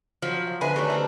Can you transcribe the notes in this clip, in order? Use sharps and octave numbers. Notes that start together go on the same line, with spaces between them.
F3 F#3 B5
F5
D3 B4 C5 E5 G#5 B5
A3 D4 G4 A4 A#4 C#5
A3 C4 D#5